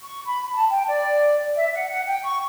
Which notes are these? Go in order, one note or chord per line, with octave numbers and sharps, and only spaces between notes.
C#6
B5
A5
G5
D5
E5
F#5
F#5
G5
C#6